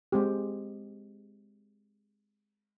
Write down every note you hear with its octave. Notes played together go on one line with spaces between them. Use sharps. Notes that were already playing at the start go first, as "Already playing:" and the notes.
G#3 C4 G4